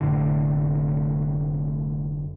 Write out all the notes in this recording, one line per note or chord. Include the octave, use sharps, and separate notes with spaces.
F1 A2 D3